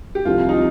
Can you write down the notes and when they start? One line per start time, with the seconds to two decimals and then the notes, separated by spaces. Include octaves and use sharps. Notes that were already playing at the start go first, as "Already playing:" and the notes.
0.15 G4
0.25 C2 C3 F3 F4
0.49 D#4
0.53 F4